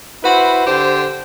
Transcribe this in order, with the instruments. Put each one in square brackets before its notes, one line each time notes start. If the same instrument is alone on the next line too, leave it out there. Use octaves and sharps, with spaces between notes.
[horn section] E4 F#4 B4 C5
D3 G4 C5